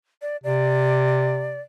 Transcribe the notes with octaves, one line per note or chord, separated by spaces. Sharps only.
D5
C3 D5